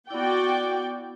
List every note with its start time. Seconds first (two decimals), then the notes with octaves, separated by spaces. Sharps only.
0.10 B3 E4 F#4 D5 G5